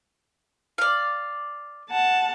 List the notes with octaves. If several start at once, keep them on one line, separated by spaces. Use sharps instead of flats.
D5 F5
F#5 A5